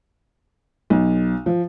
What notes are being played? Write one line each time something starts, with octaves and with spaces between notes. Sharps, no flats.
B1
F3